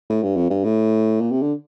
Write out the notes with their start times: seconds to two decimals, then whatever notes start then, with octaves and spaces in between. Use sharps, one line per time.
0.10 A2
0.23 G2
0.36 F2
0.50 G2
0.65 A2
1.21 A#2
1.31 C3
1.42 D3